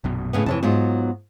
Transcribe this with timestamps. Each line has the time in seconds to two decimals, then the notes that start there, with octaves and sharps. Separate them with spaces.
0.04 A#1 F#2 B2
0.33 A2 C#3 B3
0.46 F2 C3 E3 C#5 A5
0.63 G#2 F#3 B3 F4